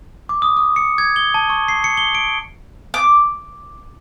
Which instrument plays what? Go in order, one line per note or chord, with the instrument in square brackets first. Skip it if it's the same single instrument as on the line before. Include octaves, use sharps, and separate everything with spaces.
[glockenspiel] D6
D#6
D#6
C#7
G#6
G7
A5
C#6
C7
C#7
G7
D7
[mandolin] D6